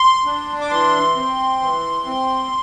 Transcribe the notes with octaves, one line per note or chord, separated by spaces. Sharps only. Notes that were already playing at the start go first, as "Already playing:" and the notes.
Already playing: C6
D4
D6
E3 C6
C4
E3
C4